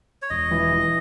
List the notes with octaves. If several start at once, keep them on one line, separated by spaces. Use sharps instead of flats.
C#5
E1 D#5
E3
E3